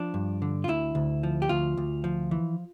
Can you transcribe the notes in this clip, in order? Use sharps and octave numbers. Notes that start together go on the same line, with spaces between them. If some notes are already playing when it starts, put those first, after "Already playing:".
Already playing: F3 D4
G2
D3
F4
D2 E4
D2
F3
G4
D2 F4
D2
F3
E3